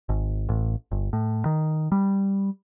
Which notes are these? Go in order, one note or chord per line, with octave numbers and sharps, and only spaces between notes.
G#1
A1
G1
A2
D#3
G3